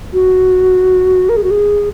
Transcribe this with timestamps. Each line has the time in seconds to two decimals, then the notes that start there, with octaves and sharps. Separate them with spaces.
0.13 F#4
1.29 A#4
1.36 G#4
1.43 F#4
1.51 G#4